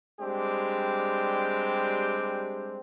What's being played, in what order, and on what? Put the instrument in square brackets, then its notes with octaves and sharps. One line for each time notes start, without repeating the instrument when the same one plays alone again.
[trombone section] G3 G#3 C4 D4 G4